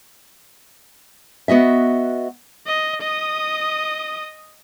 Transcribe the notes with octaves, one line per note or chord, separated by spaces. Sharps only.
B3 F#4 D#5 E5
D#5
D#5 D#6